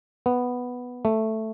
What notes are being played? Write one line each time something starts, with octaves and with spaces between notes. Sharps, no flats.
B3
A3